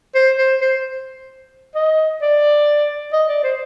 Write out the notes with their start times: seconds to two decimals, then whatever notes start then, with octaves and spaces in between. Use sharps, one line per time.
0.15 C5
0.38 C5
0.61 C5
1.75 D#5
2.22 D5
3.13 D#5
3.28 D5
3.43 C5